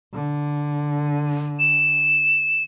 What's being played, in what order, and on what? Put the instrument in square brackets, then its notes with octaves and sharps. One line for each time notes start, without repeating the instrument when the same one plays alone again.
[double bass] D3
[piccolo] E7